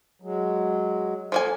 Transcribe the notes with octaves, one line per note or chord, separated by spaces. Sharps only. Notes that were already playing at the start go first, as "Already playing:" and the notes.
F#3 G#3
F3 A#3 A4 G#5